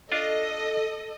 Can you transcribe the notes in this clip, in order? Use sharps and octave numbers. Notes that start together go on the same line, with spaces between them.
D4 F4 A4 D#5